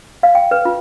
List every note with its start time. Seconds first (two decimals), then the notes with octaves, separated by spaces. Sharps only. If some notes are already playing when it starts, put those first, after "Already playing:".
0.23 F5
0.35 G5
0.51 B4
0.65 F4